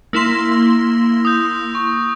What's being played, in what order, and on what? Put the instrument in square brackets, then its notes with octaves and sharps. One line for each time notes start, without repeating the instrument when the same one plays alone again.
[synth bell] A#3 E4 C6 [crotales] E6 A#6
[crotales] D#6 G6
C#6